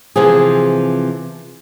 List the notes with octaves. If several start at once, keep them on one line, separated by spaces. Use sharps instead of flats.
C3 E3 F3 G#4